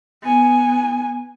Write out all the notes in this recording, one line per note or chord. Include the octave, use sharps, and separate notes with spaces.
B3 G#5